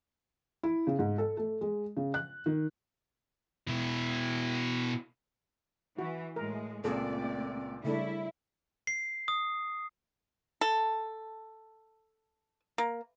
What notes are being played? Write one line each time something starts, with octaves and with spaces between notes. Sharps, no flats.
E4
C#3
G#2
A4
A3
G#3
C#3
F#6
D#3
B2 E4
E3 F#4
A2 G#3 A#4
C#2 A#2 A3 C4 G#4 A4 D5
C#3 G3 A3 D4 E4
C7
D#6
A4
A#3